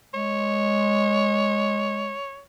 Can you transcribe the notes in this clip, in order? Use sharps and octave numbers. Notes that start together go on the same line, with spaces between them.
G#3 C#5